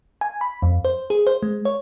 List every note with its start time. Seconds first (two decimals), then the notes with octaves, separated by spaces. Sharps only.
0.21 G#5
0.41 B5
0.62 F2
0.85 C5
1.10 G#4
1.27 C5
1.43 G#3
1.65 C#5